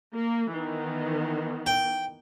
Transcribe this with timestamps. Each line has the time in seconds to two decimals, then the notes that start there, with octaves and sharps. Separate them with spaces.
0.14 A#3
0.51 D#3 E3 B3
1.66 G5